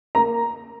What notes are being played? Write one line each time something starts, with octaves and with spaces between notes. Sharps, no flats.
A#3 A#5